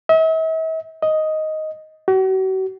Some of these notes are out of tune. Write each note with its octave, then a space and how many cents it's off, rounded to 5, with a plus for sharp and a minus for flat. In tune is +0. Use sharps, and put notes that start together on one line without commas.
E5 -45
D#5 +5
F#4 +40